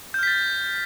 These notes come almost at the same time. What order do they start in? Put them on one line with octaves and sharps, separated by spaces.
G6 F6 B6 A6